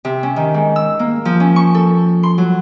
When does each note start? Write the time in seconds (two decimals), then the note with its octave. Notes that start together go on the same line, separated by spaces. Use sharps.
0.05 C3
0.23 C#4
0.36 D#3
0.54 G#2
0.76 E6
0.99 A#3
1.25 F3
1.40 C#4
1.56 C#6
1.75 A4
2.23 C6
2.38 F#3